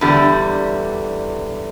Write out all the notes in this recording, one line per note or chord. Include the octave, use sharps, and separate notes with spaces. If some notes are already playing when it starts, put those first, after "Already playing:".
E2 D3 G3